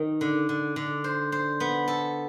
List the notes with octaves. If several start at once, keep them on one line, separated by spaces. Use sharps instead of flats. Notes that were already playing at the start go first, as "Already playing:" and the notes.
Already playing: D#3
D3
D3
D3
C5
C5
B3
A4